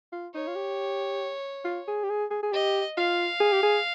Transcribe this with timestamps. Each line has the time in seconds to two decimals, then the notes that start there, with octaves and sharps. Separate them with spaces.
0.12 F4
0.34 D#4 C#5
0.48 F4
0.55 G4
1.65 F4
1.88 G#4
2.04 G4
2.10 G#4
2.31 G#4
2.43 G#4
2.52 G4 D#5
2.97 F4 F5
3.40 G#4
3.53 G4
3.63 G#4